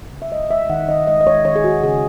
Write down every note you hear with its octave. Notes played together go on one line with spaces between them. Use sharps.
C#3
E5
G#3 D#5
G#3 E5
D#3 F#5
D#3 D#5
G#3 D#5
D#5
G#3 C#5
D#3 C#5
G#4
D#3 F#4
C#3 G#4